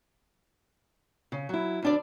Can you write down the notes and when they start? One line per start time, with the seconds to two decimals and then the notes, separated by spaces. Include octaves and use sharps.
1.32 C#3
1.49 F#3 E4
1.82 D2 D4 D5